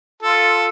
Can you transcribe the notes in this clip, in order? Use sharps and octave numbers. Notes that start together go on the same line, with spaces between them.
F4 A4